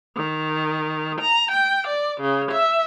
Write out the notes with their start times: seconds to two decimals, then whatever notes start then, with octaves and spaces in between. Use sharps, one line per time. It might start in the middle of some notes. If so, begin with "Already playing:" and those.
0.15 D#3
1.20 A#5
1.50 G5
1.87 D5
2.21 C#3
2.51 E5